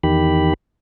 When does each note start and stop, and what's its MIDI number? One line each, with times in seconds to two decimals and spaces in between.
0.03 0.53 40
0.03 0.53 51
0.03 0.53 67
0.03 0.53 83